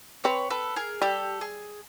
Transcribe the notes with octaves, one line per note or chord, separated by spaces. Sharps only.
C4 B4 C#5
A4 B4
G#4 A#4
G3 G4 A4
G#4